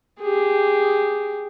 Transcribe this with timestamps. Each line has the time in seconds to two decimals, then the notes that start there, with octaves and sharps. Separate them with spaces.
0.20 G4 G#4